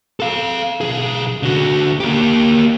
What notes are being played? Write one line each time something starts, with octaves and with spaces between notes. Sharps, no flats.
A4 F5
B1 G#4
D3 F#4
A#3 G4